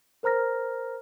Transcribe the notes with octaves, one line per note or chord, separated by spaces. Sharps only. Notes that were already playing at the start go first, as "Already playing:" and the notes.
A#4 C5 A#5 F6 A#6